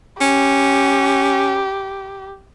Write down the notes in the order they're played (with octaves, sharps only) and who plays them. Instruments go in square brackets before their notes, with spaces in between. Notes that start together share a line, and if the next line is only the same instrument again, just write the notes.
[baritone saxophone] C#4 [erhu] G4